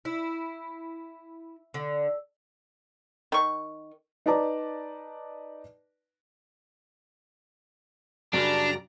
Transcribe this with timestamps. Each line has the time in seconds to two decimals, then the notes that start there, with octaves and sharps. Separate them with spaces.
0.05 E4
1.74 D3
3.32 D#3 C#6
4.26 D#4 B4 D5 A5 A#5 D6
8.33 F#2 C#3 G3 D4 D5 A#5